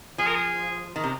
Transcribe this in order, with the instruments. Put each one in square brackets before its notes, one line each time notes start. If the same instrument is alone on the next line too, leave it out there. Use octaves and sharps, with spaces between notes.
[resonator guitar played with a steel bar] F3 [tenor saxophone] G#4
[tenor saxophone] A#4
G#4
[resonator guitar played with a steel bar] D#3
C3